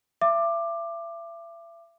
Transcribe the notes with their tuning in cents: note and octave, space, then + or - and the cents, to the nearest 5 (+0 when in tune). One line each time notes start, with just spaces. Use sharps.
E5 +35 D6 +15